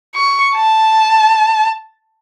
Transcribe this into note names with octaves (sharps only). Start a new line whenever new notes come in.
C#6
A5